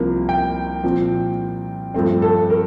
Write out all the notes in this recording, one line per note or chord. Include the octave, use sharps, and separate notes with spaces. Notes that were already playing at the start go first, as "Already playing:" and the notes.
Already playing: C2 C3 F3 A#3
G5
A#2 F3 C4
G2 F3 A3 C4
A4
A#4